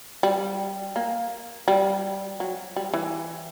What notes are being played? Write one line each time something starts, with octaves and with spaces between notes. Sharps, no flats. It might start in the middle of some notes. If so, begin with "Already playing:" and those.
G3
A#3
G3
F#3
G3
E3